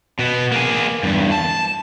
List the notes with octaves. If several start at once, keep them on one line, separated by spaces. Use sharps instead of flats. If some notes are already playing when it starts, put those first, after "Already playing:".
B2 B3
A#3 G#4
E2 G2
A5